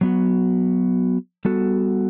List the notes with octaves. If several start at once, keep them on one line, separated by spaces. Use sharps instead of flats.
F#3 B3 F#4
G3 B3 F#4 A4